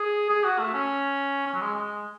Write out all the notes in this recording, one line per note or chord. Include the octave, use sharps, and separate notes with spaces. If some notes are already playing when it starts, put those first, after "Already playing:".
Already playing: G#4
G#4
F#4
A3
C#4
C#4
F#3
G#3
G#3